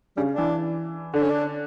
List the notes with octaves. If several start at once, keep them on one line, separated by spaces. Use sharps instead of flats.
C#3 G3
D4
E3
D3 D4
C#4
D4